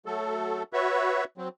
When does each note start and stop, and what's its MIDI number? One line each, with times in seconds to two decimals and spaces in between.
0.06 0.63 54
0.06 0.63 57
0.06 0.63 69
0.73 1.24 66
0.73 1.24 71
0.73 1.24 73
0.73 1.24 76
1.38 1.49 54
1.38 1.49 60